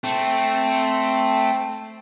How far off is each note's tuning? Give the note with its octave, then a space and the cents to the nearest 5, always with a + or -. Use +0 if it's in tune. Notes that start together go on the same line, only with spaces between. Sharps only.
A3 +0 C4 +0